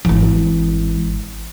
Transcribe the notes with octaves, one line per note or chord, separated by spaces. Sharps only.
G#1 E3